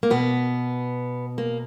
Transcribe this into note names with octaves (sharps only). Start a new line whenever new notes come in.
A#3
B2 B3
A#3